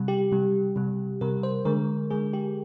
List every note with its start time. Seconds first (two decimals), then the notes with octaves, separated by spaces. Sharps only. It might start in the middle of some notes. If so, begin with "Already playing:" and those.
Already playing: C3 G3
0.08 G4
0.32 C3 G3
0.76 C3 G3
1.21 C3 G3 A#4
1.43 C5
1.65 D3 G#3 A#4
2.10 D3 G#3 G#4
2.33 G4